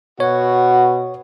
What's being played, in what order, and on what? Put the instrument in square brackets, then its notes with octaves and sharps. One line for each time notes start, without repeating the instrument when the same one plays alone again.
[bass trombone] B2 [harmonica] F#4 [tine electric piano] C#5